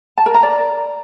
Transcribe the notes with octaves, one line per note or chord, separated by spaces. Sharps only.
A5
A#4
A#5
D5